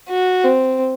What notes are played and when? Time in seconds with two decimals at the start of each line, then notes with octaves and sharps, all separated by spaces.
0.09 F#4
0.44 C4